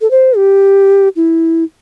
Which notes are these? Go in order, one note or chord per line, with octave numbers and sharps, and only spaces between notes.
A4
C5
G4
E4